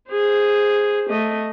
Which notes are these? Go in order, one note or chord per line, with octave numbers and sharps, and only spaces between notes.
G#4 C5
A3 D#5